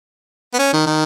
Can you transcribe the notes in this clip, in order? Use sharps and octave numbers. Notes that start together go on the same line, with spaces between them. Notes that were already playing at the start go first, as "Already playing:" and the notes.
B3
C#4
D#3
D#3